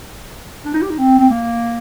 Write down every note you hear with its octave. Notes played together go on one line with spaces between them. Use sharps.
D4
D#4
G4
D#4
C4
C4
A#3